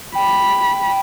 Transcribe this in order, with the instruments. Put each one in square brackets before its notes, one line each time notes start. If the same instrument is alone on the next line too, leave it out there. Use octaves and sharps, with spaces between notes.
[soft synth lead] G5 [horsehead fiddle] B5